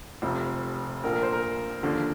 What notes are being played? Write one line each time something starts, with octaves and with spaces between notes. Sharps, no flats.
F1 F2 C3 F3
A#1 A#2 F3 A#4
A#4
C5
A#4
D#2 D3 F3